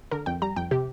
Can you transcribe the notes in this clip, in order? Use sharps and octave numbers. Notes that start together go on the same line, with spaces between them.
D3 A#4
F2 G5
G3 A#5
F2 G5
C3 G4